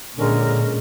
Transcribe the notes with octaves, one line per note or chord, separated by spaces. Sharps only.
A#2 D3 G#3 C#4 A#4